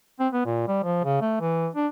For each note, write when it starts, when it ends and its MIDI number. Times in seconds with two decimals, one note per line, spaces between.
0.20 0.28 60
0.33 0.44 59
0.45 0.67 46
0.68 0.83 55
0.83 0.99 53
1.04 1.19 49
1.21 1.37 57
1.40 1.68 52
1.75 1.87 62